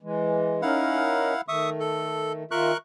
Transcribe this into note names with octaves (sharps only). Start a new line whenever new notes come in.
E3 G#3
C#4 D#4 E4 A#4 F5 F#5
D#3 A3 E5 C#6 D#6
A4
D#3 F4 A#4 E5 C#6 F#6